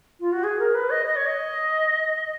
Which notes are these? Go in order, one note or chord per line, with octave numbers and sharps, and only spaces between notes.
F4
F#4
G#4
A#4
B4
D#5
D#5
C#5
D#5